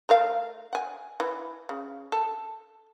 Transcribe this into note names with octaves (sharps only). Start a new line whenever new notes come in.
A3 A#4 F5
F#5 G#5
E3
C#3
A4